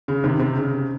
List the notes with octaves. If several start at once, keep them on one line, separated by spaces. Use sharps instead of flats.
C#3
C3 D#3
C3
C#3